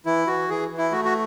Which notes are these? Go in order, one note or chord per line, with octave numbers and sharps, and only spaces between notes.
E3 E4
E3 F#4
E3 G#4
E3
E4
A3 F#4
F#4